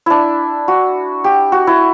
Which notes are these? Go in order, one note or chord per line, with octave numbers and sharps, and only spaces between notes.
D4 E4
F#4
G4
F#4
E4